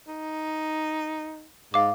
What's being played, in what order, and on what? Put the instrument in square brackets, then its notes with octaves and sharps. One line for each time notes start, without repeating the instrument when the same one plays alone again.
[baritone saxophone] D#4
[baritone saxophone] G#2 [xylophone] F5 D6